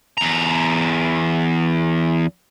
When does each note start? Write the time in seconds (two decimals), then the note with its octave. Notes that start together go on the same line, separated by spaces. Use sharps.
0.17 E2 A#5